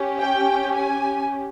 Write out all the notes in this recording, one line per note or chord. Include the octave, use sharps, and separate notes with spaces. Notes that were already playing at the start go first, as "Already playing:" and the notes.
Already playing: C#4 G4
G5
G#5